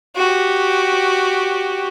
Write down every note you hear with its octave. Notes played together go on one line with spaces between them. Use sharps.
F#4 G4